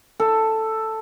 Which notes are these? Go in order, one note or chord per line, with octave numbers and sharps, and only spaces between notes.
A4